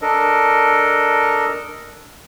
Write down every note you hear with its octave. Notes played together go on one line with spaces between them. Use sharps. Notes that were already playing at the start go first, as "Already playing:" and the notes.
D4 A4 A#4 D#5